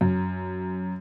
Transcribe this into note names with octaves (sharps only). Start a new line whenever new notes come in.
F#2